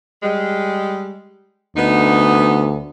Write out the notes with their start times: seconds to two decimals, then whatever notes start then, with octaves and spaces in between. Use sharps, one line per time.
0.21 G3 G#3
1.76 D2 B3 D#4